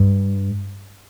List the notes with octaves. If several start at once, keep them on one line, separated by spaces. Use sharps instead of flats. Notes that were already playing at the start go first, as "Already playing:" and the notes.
Already playing: G2